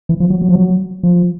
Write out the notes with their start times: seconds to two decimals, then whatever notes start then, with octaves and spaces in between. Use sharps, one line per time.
0.09 E3
0.20 F3
0.30 F#3
0.42 F#3
0.48 F3
0.56 F#3
1.03 F3